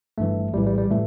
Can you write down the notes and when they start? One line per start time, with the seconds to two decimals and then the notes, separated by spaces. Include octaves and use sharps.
0.18 G1 G2 E3 A3
0.54 A#1 A2 E3 G3
0.67 G3
0.78 G3
0.91 A2 E3 A3